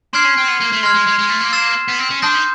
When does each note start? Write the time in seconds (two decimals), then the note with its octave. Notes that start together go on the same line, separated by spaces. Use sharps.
0.13 D4 C6 F6 G#6 C7
0.25 C#4
0.37 C4
0.48 B3
0.60 A#3
0.72 A3
0.83 G#3 C6 F6 G#6
0.94 G#3
1.07 G#3
1.19 G#3
1.29 A3
1.41 A#3
1.52 E6 A6 C7 E7
1.88 B3
1.99 C4
2.11 C#4
2.22 D4 A5 C6 D#6 G6 A#6
2.34 D#4